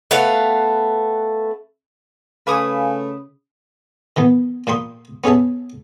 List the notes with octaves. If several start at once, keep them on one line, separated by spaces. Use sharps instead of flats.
A3 B3 B4 F5
C#3 A3 B4 F5 G#5 C#6 D#6
D#3 E3 B3
A#2 A#3 G5 B5 C6 D#6
B3 C#4 G#4 E5 A5